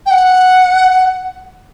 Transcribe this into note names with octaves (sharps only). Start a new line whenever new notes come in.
G5
F#5